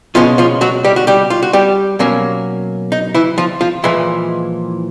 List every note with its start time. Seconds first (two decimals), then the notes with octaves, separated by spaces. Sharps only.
0.15 B2 F3 G#3 C#4 F4
0.38 F3 F4
0.61 F#3 F#4
0.84 G3 G4
0.96 F#4
1.07 G3 G4
1.30 F4
1.43 F#4
1.53 G3 G4
1.99 B2 F#3 A#3 C#4
2.92 D#4
3.14 E3 E4
3.38 F3 F4
3.61 F3 F4
3.84 A#2 E3 F3 G#3 E4